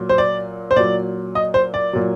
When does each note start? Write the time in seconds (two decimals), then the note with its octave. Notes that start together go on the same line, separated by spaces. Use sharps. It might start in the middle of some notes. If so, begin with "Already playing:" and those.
Already playing: A#2 F#3
0.09 C5
0.18 D5
0.71 C5
0.76 A#2 F#3 D5
1.35 D#5
1.54 C5
1.74 D5
1.93 A#2 F#3